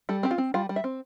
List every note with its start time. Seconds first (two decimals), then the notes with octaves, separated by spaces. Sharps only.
0.09 G3 A4
0.23 C4 G4
0.31 F4
0.38 C4
0.54 G3 F4
0.69 G3
0.76 E5
0.84 C4